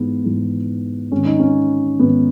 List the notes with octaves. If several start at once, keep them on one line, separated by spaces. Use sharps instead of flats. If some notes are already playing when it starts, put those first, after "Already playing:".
Already playing: G#2 E3 B3
G#2 E3
G#2 D#3 C#4
D#4
C#4
G#2 D#3 B3